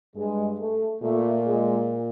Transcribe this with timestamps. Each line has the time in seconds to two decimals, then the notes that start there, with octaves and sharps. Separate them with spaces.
0.16 G2 G#3
0.59 A3
1.02 A#2 A3
1.46 G#3